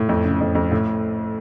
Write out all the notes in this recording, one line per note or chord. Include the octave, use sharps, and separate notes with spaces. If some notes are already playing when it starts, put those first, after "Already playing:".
Already playing: A2
F2
C#3
F2
F2
A2